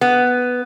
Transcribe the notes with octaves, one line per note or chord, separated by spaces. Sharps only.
B3